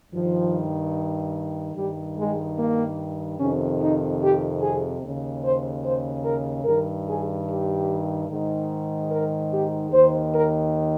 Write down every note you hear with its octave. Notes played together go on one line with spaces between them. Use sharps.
G2 D#3 F3
G2 D#3 G3
G#3
A#3
F2 C3 D#3 C#4
D#4
G4
G#4
D#2 C#3
C5
C5
A#4
G2 D#3 A#4
G#4
G4
G#2 D#3
A#4
G4
D#2 D#3 C5
A#4